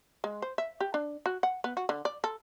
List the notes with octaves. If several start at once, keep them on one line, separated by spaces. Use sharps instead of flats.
G#3
C5
E5
G4
D4
F#4
F#5
B3
F#4
D3
D5
A4